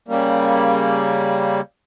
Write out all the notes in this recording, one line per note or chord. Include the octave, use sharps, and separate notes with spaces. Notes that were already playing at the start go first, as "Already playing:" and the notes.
C#3 G3 A#3